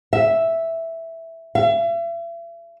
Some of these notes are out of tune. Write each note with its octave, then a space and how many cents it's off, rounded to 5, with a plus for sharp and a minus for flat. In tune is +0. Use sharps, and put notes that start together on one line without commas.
E5 +0
E5 +40